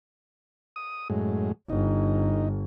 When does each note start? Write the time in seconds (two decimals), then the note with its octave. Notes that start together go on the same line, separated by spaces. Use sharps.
0.76 D#6
1.10 F#2 A2 G#3
1.70 G1 D#4